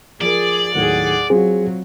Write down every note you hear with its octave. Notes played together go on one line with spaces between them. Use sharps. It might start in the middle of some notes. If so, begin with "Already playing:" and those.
F3 G#4 A#4 D5
D#2 A2 F#3 G#4 F#5
F#3 C4 F4 F#4 G#4